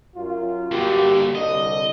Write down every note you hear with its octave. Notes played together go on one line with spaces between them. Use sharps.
F#2 F4
G2 D3 A#3 F#4 G4
C2 D3 D#5